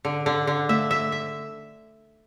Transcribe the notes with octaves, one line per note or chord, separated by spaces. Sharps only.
D3
D3
D3
A3 E5
E5
E5